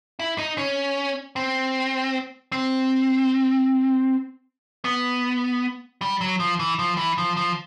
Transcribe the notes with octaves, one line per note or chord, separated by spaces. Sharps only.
E4
D#4
C#4
C4
C4
B3
G3
F#3
F3
E3
F3
E3
F3
F3